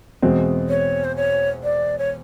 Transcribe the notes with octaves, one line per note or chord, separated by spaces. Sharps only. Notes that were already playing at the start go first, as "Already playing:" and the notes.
E2 B2 G#3 C4
C#5
C5
C#5
D5
C#5